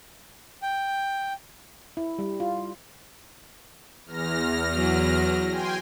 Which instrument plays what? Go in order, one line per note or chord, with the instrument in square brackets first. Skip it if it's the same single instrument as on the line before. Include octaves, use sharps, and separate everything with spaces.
[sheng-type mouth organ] G5
[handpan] E4
G3
F4
[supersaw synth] E2 F6 A#6
[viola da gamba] F#3
[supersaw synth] G5 G#5 C6